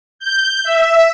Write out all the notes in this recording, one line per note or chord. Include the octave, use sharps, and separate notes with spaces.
G6
E5